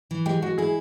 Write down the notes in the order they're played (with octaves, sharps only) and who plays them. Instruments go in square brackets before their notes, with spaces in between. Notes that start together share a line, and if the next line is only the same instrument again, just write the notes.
[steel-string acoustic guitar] E3
[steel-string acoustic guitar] G#3 [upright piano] G4
[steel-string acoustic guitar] G#3 [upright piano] F#4
[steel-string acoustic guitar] E4 [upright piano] G#4